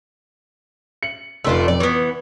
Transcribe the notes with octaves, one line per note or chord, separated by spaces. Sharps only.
C#7 F#7
F1 A3 D4 F4 C6
F2 D5
E3 B3 C#6